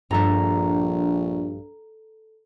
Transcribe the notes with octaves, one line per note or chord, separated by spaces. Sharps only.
A#1 G2 D4 A4 A#5